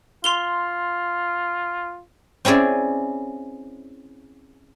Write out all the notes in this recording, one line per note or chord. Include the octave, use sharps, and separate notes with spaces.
F4 C6 F7 G7
C4 C#4 E4 G#4 D5